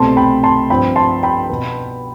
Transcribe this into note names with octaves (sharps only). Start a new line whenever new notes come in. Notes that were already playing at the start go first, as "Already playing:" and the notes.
Already playing: C2 B2 A3 C4 A5 C6
G5 B5
A5 C6
G2 F3 C4 G5 B5
A5 C6
G5 B5
B2 B3